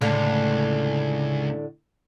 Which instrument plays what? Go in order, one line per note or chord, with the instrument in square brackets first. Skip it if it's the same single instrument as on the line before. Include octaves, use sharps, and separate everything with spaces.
[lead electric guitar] C#2 [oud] A2 D3 F5